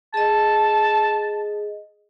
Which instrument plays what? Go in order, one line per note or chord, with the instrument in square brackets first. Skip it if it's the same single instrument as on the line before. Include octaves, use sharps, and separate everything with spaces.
[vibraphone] G#4 D#5 [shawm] A5